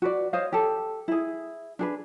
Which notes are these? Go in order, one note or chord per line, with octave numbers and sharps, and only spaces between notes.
F#4 B4 D5
C5 C#5 D#5 F5
G4 A4
E4 G#4
D4 G#4 B4